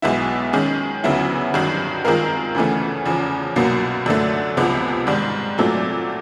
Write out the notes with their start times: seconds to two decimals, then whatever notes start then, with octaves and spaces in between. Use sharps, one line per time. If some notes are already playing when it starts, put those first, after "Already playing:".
0.02 B1 B2 G#3 B3 E4
0.53 D#3 G#3 C#4
1.04 D2 C#3 F#3 B3 E4
1.54 G2 D#3 F#3
2.05 D#3 G#3 C4 F4 A#4
2.55 D2 C#3 E3 A3
3.06 E2 C#3 F3
3.56 C2 B2 F#3 A#3
4.06 F#2 D3 F#3 A3
4.57 C#2 C3 F3 G#3 B3
5.07 G#2 D#3 G3
5.58 A#2 F#3 A3 C4